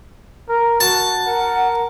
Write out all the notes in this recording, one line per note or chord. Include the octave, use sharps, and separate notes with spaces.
A#4
F#4 A5
A#4 F#5